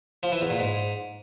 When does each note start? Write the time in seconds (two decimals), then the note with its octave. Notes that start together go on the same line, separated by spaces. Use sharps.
0.23 F3
0.32 E3
0.41 E2
0.50 A#2
0.59 G#2